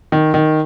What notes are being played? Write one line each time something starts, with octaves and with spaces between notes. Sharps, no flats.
D#3
D#3